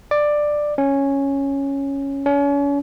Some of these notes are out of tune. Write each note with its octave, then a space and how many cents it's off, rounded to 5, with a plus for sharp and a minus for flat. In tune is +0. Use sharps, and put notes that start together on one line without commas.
D5 +10
C#4 -5
C#4 +35